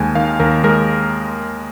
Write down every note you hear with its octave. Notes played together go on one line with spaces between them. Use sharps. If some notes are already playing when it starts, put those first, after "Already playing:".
Already playing: D#2 G#3 G#5
D#3 F5
D#2 A#4
G#3 A#4